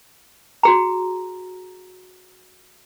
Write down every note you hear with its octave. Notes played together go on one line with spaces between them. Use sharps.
F#4 G#4 A#5